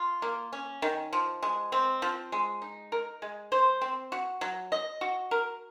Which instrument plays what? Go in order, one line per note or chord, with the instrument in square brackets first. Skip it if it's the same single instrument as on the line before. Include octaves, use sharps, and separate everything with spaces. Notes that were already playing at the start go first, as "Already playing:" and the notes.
Already playing: [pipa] F4
A#3
C#4
D#3
F3
G#3
C4
F3
G#3
D#4
A#4
G#3
C5
C4
F#4
F#3
D#5
F#4
A#4